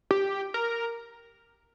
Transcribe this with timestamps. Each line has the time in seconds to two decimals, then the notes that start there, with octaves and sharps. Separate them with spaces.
0.11 G4
0.54 A#4